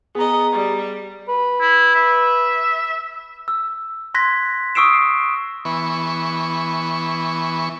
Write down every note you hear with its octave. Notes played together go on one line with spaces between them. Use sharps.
B3 G#4 D#5 A#5
G3
B4
E4
E5
E6
C6 F#6 G#6 A#6 B6
C#6 D#6 E6 C7 D7 E7
E3 B3 C#6